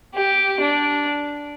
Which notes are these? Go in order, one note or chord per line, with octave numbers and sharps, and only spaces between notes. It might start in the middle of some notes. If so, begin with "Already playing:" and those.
G4
D4